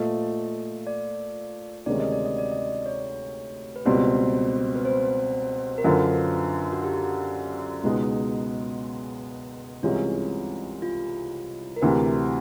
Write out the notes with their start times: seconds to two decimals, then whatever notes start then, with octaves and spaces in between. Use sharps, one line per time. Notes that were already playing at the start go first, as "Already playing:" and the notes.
Already playing: A#2 F3 A3 D#5
0.87 D5
1.86 D2 C3 D#3 G#3 C#4 D5
2.00 D#5
2.12 D5
2.26 D#5
2.38 D5
2.52 D#5
2.66 D5
2.86 C#5
3.76 B4
3.85 C#2 B2 G3 C4 C5
4.75 B4
4.85 C5
5.78 A#4
5.84 F#2 D3 F3 B4
6.73 F#4
6.84 G4
7.83 C#2 B2 G#3 B3 D#4
9.83 C2 C3 E3 G#3 C#4 F4
10.82 F4
11.76 A#4
11.82 D2 C3 E3 B4